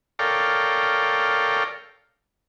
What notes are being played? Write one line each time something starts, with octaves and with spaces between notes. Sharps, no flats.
A4 A#4 C#5 D5 F5 G5